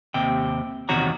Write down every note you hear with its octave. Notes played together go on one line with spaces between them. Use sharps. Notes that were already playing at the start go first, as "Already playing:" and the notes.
D#2 C3 G5
E2 C3 D#3 F#4 C#5 A#5